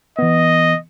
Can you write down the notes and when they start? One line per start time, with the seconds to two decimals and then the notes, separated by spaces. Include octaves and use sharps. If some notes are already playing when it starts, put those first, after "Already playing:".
0.19 E3 B3 D#5